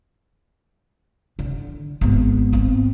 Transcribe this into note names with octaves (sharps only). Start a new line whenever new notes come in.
D3
G#1 B3
B3 C4